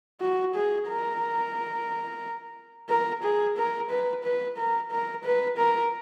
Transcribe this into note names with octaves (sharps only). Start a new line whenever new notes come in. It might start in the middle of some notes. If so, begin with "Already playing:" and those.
F#4
G#4
A#4
A#4
G#4
A#4
B4
B4
A#4
A#4
B4
A#4